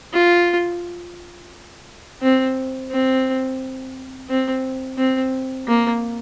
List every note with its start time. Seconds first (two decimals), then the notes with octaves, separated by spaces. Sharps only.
0.13 F4
2.22 C4
2.91 C4
4.29 C4
4.98 C4
5.68 A#3